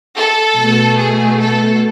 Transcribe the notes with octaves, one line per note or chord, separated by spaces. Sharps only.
A4
B2 A3
G#4
A4